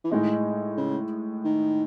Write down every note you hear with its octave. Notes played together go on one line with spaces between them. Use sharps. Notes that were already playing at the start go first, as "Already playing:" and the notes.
E3
A2 D#3 G#3 D#4
C#3
D#3